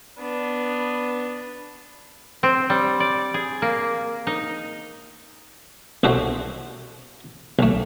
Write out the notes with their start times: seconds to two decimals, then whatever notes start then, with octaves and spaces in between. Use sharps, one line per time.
0.19 B3 D4
2.43 C4
2.70 G3
3.00 D5
3.34 G#4
3.62 A#3
4.27 D#4
6.03 C2 B2 F#4 A4 C5 E5
7.59 B1 A3